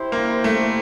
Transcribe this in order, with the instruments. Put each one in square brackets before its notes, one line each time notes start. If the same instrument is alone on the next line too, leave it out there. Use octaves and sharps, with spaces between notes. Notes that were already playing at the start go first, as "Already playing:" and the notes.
Already playing: [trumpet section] E4 G4 C5
[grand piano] A#3
A3